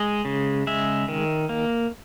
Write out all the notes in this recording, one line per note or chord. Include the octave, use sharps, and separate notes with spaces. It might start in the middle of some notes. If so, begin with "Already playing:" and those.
Already playing: G#3 D#5
C#3
G#3 E5
D#3
A#3